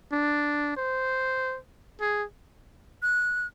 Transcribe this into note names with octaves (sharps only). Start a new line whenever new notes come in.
D4
C5
G#4
F#6